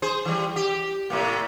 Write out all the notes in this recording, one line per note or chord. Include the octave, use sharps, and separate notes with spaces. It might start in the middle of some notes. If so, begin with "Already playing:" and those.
G#4 C5
E3 G3
G4
A2 C3 A#3